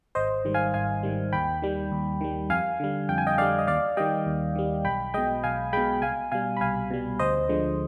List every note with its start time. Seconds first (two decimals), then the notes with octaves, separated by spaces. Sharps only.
0.15 G#1 C5 D#5
0.45 G#2 D#3 G3
0.54 F5 G#5
0.74 G#1 F5 G#5
1.03 G#2 D#3 G3
1.33 D#2 G5 B5
1.62 D#3 G3
1.92 D#2
2.21 D#3 G3
2.50 F2 F5 G#5
2.80 D3 G3
3.09 F2 G5
3.18 G#5
3.27 D#5 G5
3.38 D3 G3 D5 F5
3.59 D#5
3.67 D#2 D5 F5
3.97 D#3 G3 D#5 G5
4.26 D#2
4.55 D#3 G3
4.85 B1 G5 B5
5.14 B2 G#3 D#5 G5
5.44 B1 F5 G#5
5.73 B2 G#3 G5 B5
6.02 C2 F5 G#5
6.32 B2 G3 F5 G#5
6.57 B5
6.61 C2 F5 G#5
6.91 B2 G3
7.19 D2 C5 D#5
7.49 D3 F3 G#3